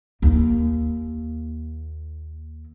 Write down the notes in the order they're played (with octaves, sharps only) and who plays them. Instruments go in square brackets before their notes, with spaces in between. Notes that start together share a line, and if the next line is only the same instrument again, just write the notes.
[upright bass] D#2 A#3